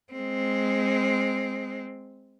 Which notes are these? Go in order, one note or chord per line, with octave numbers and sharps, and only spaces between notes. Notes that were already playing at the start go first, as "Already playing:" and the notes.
G#3 C4